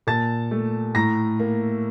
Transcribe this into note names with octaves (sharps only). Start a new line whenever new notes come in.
A#2 A5 A6
A3
A2 A#5 A#6
A#3